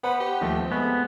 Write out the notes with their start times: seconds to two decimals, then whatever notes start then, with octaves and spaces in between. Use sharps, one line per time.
0.03 B3 B4 C5 F#5
0.20 G4
0.41 D#2 F3 A3
0.59 C4
0.72 G#3 A3 B3